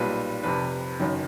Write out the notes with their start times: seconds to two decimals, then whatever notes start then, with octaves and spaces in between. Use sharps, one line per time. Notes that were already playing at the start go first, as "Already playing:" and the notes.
Already playing: B1 A#2 G3 B4
0.43 F1 F2 C3 B4
1.00 F#1 F#2 D#3